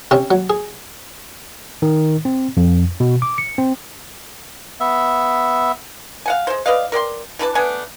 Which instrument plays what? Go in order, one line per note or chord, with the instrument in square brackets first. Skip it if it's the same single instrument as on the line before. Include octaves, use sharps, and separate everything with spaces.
[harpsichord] C3 C4 C#4
F#3
G#4
[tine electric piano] D#3
C4
F2
B2
D6
C#7
C4
[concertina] B3 E5
[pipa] F5 F#5 G#5
G#3 C5
B4 D5 D#5 F5
A#4 D5 G5 C6
E3 D4 B4 A5
A3 B3 D4 G#5